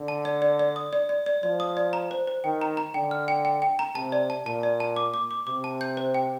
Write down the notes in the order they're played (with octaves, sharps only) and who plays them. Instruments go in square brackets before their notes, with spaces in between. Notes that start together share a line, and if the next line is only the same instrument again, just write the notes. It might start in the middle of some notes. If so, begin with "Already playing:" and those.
Already playing: [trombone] D3
[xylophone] A5
D5
D5
D5
D#6
D5
D5
D5
[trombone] F3 [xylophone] D5
[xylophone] D#6
D5
A#5
C5
C5
[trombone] D#3 [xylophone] G5
[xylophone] A#5
A#5
[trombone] D3 [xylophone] G5
[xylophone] F6
G5
G5
G5
A#5
[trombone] C3 [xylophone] A5
[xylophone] D5
A5
[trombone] A#2 [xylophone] A5
[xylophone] D5
A5
D6
D6
D6
[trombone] C3 [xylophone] D6
[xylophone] A5
G6
C5
G5